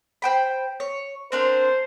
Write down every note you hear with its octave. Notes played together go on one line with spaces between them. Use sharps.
C5 G5 B5
C#5
C4 D4 A#4 C5